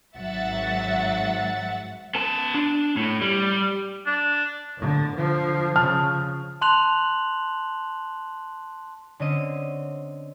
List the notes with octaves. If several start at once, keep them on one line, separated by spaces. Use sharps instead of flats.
G#1 G#2 F#3 E5 F#5 A6
B3 A5
D4
A2
G3
D4
A2 D3
D3 F3
C#3 F3 A5 F6
A5 C6 F#6 F7 F#7
D3 C4 C#4 D#5 D#7